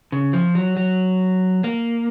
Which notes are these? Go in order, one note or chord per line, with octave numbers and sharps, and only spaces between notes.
C#3
F3
F#3
F#3
A#3